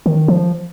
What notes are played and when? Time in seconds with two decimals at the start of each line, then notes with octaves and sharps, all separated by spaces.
0.06 D#3
0.28 F3